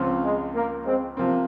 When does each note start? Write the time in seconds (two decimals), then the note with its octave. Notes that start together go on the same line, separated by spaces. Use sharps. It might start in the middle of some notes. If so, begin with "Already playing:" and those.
Already playing: C#2 C#3 F3 C4 F4
0.23 G#3
0.55 A#3
0.85 G#3 C4
1.17 C3 F3 A#3 C4